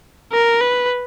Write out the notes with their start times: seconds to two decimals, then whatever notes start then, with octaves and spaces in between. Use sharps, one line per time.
0.32 A#4
0.61 B4